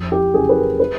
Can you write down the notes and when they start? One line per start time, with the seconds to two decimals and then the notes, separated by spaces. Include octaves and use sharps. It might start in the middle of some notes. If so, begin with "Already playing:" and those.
Already playing: F2
0.12 G4
0.34 C#3 F#3 G#4
0.49 B4
0.57 A#4
0.80 B4